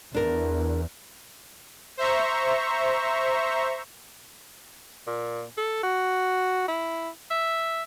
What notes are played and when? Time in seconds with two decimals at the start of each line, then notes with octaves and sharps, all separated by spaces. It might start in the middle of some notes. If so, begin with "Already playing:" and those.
0.15 E2 D4 A#4
1.97 C5 E5 A#5 C#6
5.07 A#2
5.58 A4
5.84 F#4
6.68 E4
7.31 E5